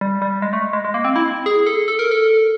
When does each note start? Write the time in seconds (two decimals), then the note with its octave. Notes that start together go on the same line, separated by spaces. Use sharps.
0.01 G3
0.22 G3
0.42 G#3
0.53 A3
0.73 G#3
0.85 G#3
0.94 A#3
1.04 C4
1.16 E4
1.46 G#4
1.66 A4
1.88 A4
1.99 A#4
2.11 A4